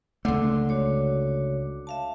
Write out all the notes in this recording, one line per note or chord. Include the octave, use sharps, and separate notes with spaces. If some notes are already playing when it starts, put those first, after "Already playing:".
C#2 D3 A3 C6 D6
F#4 C#5 D6
E5 F5 A5